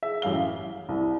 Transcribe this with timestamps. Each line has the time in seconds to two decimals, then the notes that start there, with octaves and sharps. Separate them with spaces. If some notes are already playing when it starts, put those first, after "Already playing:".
0.03 G#4 E5
0.22 A1 F#2 G3 F5 G7
0.41 F5
0.89 C2